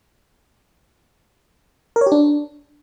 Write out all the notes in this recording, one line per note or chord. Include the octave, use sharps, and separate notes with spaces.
A#4
C#5
G4
D4